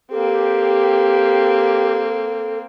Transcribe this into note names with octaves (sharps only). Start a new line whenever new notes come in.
A#3 C4 G4 A4